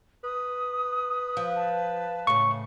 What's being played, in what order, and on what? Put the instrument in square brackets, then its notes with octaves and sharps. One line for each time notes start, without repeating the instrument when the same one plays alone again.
[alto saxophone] B4 [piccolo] D#6
[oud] F3
[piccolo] A5
[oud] A2 C#3 [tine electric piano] C#6